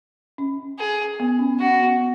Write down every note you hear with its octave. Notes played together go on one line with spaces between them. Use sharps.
C#4
G#4
B3
C#4
C#4 F#4
B3
B3